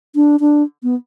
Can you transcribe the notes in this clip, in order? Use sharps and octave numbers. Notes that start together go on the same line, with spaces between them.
D4
D4
B3